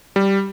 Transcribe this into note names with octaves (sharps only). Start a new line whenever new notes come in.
G3